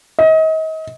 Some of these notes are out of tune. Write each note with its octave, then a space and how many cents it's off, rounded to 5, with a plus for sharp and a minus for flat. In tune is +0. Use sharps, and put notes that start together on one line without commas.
D#5 +35